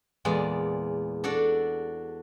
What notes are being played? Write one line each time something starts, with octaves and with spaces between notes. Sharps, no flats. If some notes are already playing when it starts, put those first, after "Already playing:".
E2 A#2 G#3 D5
D4 F#4 A4 D5